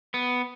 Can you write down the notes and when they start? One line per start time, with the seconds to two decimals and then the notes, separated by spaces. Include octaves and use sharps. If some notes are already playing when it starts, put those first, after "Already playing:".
0.14 B3